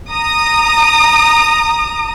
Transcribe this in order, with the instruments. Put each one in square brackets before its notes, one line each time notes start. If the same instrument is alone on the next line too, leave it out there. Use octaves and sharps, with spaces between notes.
[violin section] A#5 D#6